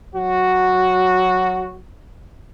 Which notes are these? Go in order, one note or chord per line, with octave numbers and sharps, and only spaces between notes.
F#3 F#4